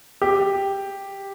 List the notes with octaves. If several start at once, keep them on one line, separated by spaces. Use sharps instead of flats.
G4